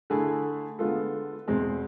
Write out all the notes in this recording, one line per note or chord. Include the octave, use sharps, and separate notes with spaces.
D3 A3 E4 G#4
D3 G#3 B3 F4 A4
E2 B2 G#3 C4